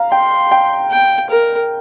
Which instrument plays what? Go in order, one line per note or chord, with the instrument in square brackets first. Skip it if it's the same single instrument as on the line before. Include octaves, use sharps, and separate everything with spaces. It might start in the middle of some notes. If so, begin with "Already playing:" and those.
Already playing: [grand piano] F5 A#5
[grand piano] G5 [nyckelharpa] C6
[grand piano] G5
[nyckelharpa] G5
A#4